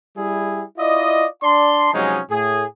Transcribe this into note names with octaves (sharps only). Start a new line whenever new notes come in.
G3 E4 G#4
E4 F4 D5 D#5
D4 D5 A5 C6
C3 F3 F#3 G#3 C#4 D#4
A2 G#4